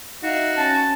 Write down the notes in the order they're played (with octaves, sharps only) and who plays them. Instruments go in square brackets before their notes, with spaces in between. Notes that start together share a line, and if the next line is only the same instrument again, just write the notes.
[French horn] D#4 [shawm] F#4 [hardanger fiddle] E5 F5
[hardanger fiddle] C#4 [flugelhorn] A5